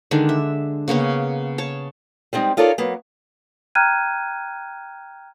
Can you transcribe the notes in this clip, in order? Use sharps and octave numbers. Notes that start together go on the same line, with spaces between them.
D3 D#3 G#3 D4
E5
C#3 A#3 B3 C#4
C#5 A5
G3 G#3 C4 D#4
D#4 F4 A4 A#4 C#5 D5
F#3 A#3 B3
G5 A#5 F6 F#6 G#6 D#7